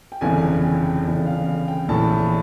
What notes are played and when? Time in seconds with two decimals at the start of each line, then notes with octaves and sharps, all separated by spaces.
0.12 G5
0.21 G1 F2 C#3 E3 G#5
0.42 G#5
0.64 G5
0.84 G5
1.05 G1 F2 C#3 E3
1.26 F5
1.46 F5
1.68 G5
1.88 A#1 A2 E3 A5